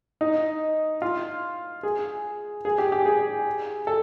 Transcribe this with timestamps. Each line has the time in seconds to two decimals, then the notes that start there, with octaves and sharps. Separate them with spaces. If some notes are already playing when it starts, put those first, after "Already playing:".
0.21 D#4
1.02 F4
1.83 G#4
2.65 G#4
2.78 G4
2.92 G4
3.06 G#4
3.87 A4